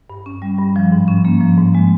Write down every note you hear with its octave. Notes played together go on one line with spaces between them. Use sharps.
G2
C#4
G3
G2
F3
G#2
C#4
A#3
F3
G#2
G#3